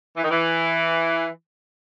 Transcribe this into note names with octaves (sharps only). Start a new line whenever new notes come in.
E3
D#3
E3